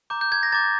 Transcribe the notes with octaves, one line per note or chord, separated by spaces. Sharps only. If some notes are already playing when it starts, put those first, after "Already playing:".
A#5 D6 G6
G6
G#6
A#6
A#5 D6 G6 A6